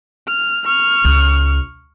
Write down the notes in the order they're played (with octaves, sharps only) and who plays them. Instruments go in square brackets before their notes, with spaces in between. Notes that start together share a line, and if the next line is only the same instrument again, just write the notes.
[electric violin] F6
C#6 F6
[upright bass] C#2